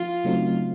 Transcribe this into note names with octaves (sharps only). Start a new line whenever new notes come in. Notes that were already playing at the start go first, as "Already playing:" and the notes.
Already playing: F3 F4
C#3 F#3 A3 C4 D#4